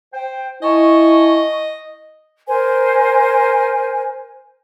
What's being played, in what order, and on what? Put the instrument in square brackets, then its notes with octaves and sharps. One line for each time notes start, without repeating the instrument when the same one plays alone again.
[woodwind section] C5 G5
[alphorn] E4 [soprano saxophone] D#5 [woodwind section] G#5 A5 C#6
[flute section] A#4 C5 G#5